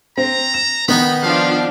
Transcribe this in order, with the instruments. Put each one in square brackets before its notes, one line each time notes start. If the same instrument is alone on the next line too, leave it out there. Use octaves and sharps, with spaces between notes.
[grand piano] C4 [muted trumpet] A#5
[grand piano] E7
[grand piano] D#3 [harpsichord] B3 D#4 [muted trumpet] B5
[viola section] F3 D4 F4 [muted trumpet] F5